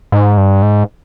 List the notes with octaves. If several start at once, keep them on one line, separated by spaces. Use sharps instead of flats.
G#2
G2
G#2